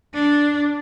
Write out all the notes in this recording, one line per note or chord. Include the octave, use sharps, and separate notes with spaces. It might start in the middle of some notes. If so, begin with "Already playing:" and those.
D4